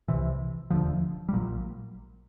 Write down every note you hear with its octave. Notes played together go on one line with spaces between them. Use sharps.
C2 C3 E3
E1 D2 D3 F3
G3
A#1 A#2 F#3